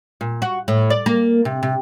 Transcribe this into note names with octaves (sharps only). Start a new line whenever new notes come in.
A#2
F#4
A2
D5
A#3
C3
C3